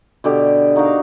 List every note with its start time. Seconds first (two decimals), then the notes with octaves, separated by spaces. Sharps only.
0.24 B2 D3 G4
0.76 D#4 F#4 A#4 F5